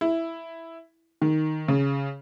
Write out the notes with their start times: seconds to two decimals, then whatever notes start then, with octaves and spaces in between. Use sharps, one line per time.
0.01 E4
1.22 D#3
1.68 C#3